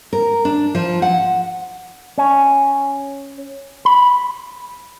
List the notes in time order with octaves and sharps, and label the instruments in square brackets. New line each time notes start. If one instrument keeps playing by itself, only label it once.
[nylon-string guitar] A#4
D4
F3
F#5
[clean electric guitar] C#4
B5